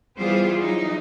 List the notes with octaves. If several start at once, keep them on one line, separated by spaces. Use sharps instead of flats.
E3 G3 B3 F4 G#4 C5
E3 F#3 D#4